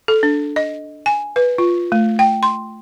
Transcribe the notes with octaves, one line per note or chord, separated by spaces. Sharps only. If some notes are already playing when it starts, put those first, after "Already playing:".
A4
D4
D#5
G#5
B4
F4
A3
G5
C6